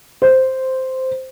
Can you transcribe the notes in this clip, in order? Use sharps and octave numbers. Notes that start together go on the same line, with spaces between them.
C5